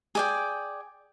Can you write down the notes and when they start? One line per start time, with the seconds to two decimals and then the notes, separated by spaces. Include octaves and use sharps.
0.15 G#4 D5 G5